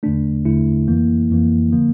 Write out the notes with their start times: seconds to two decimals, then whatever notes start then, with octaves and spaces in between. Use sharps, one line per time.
0.03 E2 D3 A3 D4
0.45 E2 D3 A3 E4
0.88 F2 E3 A#3
1.30 F2 E3 A#3
1.72 D3 F3 A#3